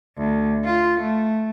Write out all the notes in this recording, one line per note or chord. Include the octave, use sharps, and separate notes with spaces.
D2
F4
A3